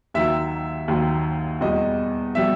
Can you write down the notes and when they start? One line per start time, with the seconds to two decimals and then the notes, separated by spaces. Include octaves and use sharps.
0.14 D#2 D#3 F#3 E5
0.88 D#2 D#3 F#3
1.61 E2 B2 G3 D#5
2.35 B2 G3 E5